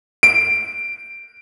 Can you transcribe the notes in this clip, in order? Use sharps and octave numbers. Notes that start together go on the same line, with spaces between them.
D7